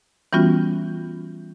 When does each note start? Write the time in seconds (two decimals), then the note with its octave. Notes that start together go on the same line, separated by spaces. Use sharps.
0.33 E3 G3 B3 C#4 F4 F#4